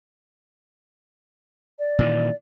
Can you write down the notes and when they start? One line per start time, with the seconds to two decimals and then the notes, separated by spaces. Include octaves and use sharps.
1.79 D5
1.99 A#2 D#3 E3